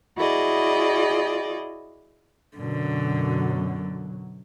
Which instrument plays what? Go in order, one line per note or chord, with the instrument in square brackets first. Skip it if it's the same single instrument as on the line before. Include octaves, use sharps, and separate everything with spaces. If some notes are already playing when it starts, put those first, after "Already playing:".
[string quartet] E4 F#4 G#4 D5 D#5
[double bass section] F#2 B2 F#3 [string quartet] D3